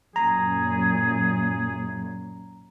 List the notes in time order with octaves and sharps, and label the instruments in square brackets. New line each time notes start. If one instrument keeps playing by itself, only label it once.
[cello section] F#2 A#2 [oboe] G#4 [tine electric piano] A#5